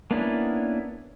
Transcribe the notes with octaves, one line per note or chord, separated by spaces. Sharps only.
A#3 B3 C#4 D4 E4